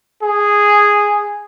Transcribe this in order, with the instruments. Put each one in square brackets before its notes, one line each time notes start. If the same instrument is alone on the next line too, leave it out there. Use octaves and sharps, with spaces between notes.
[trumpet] G#4